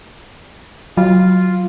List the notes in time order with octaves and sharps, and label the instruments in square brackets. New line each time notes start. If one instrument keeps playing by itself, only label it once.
[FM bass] F#3 [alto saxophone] F4